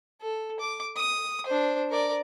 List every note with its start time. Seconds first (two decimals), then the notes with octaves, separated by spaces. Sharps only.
0.22 A4
0.60 D6
0.97 D#6
1.46 D4 C5
1.90 A#4 D5